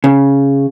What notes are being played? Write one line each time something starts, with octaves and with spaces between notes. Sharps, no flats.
C#3